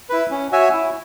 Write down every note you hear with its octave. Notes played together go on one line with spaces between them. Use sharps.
E4 B4
C#4
F#4 C#5 E5 G#5
E4